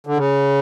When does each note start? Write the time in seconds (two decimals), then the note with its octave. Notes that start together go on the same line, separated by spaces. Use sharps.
0.07 D3
0.17 C#3